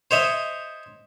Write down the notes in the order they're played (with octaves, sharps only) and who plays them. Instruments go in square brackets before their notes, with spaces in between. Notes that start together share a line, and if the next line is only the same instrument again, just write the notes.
[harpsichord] C5 C#5 D#5 E5